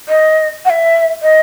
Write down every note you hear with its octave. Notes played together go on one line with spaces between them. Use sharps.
D#5
F#5
E5
D#5